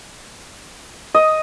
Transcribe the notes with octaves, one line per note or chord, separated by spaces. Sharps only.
D#5